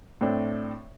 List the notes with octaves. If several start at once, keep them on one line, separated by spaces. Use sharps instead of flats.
A2 C4 D4